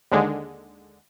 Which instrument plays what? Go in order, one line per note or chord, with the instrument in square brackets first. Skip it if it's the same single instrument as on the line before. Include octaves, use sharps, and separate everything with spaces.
[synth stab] D#2 D3 G#3